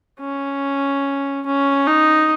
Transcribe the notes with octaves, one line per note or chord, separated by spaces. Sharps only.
C#4
C#4
D#4